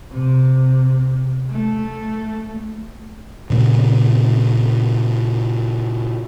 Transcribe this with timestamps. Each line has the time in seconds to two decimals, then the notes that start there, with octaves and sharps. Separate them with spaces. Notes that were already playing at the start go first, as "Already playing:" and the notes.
0.12 C3
1.50 A3
3.50 A#2 C#3 A3